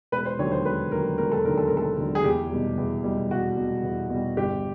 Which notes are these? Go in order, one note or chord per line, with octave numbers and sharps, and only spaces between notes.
E1 B4
C5
D#2 D3 F#3 C#5
C5
E1 B4
D#2 D3 F#3 A#4
E1 A#4
A4
D#2 D3 F#3 A#4
A4
E1 A#4
A4
D#2 D3 F#3
G#4
E2 G4
B2 G3
E2
B2 G3
E2 F#4
B2 G3
E2
B2 G3
G1 G4